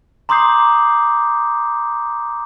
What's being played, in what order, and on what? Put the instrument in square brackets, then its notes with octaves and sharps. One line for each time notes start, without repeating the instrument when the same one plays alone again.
[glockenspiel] A#5 C6 D6 D#6 G6 C7